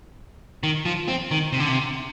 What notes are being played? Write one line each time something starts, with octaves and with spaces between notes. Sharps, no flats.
D#3
F3
C4
D#3
C3
D3
C3